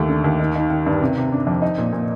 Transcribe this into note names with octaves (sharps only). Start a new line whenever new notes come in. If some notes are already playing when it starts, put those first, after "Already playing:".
Already playing: D#2 A3
D3
D#2
D#3
D#3
D#3
G2
C3
C3
D4
F2
D#4
A#2
A#2